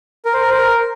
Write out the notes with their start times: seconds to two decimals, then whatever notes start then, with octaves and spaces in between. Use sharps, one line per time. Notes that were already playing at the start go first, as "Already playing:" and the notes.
0.25 A#4
0.33 C5
0.42 A#4
0.50 C5
0.57 A#4